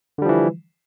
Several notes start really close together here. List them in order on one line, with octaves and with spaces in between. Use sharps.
D3 G3 F3 E3